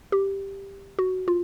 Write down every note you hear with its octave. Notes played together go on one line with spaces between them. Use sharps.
G4
F#4
F4